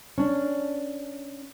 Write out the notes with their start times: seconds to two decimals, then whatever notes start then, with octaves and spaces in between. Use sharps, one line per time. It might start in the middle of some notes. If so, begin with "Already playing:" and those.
0.18 C#4 D4